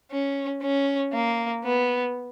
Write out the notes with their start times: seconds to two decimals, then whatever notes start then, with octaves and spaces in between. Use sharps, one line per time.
0.11 C#4
0.62 C#4
1.13 A#3
1.64 B3